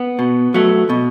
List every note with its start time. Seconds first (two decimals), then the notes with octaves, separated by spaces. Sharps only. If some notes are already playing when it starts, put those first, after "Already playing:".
Already playing: B3
0.19 B2
0.54 F#3 A3
0.89 B2